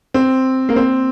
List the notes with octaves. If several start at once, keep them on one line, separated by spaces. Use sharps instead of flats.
C4
A#3
C4